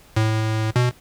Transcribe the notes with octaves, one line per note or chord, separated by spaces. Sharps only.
A2
B2